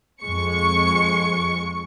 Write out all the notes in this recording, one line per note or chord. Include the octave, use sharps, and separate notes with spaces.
F2 G#3 C#6 C#7